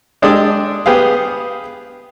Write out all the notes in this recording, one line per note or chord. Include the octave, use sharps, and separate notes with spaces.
G#3 D4 G4 A4 D5 D#6
B3 G4 G#4 F5